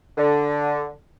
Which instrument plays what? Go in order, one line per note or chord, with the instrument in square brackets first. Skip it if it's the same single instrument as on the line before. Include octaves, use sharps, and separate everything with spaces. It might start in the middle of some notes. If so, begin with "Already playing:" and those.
[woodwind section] D3